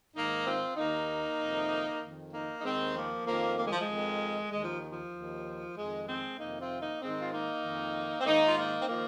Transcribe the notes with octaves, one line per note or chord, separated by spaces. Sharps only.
G#2 D#3 A#3 D#4
C4 F4
D#2 D#3 A#3 D#4
F2 C3 D#3
F2 D#3
A#3 D#4
D#4
D#2 D#3 G#3 C4
F3 A#3
F2 D#3 F3 A#3
A#3
G#3
F3
G#3
F2 D#3
D#2 D#3 G#3
F3
F3
D#2 D#3
F2 D#3 G#3
G#3 C4
F2 C3 D#3 A#3 D#4
C4 F4
A#3 D#4
G#2 D#3 G#3 C4
F4
A#3 D#4
F2 D#3
C4
G#2 D#3 A#3 D#4
F4
A#3 D#4
C4
D#3 F3 A#3